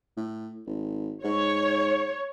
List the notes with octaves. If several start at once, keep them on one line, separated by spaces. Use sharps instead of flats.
A2
G#1
G#2 C#5